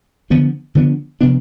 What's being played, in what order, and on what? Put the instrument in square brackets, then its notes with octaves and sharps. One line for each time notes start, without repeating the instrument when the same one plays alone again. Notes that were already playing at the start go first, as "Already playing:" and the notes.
[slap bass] D3 F3 B3 D4
D3 F3 B3 D4
C3 F3 B3 D4